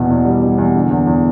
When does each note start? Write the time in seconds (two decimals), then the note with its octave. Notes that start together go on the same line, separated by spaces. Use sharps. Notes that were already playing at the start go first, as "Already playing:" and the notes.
Already playing: E2 B2
0.10 E2
0.25 G3
0.42 G3
0.58 E2
0.74 D3
0.90 E2
1.07 E2